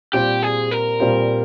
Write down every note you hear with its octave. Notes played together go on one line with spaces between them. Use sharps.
A#2 G3 C4 F4 G4 C5
G#4
A#4
A#2 G3 C4 F4 C5